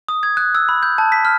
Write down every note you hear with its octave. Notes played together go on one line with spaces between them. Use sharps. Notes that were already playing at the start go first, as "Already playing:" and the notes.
D#6
G#6
F#6
E6
B5
G6
A5
B6
F6